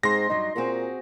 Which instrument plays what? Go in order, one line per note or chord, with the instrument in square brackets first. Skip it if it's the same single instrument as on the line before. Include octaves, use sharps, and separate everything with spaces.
[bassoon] G#2 [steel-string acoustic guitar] G#3 C4 [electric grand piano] C6 A#6
[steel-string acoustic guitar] G2 F#3 [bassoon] D#4
[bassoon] A#2 [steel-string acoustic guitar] C4 F#4 G#4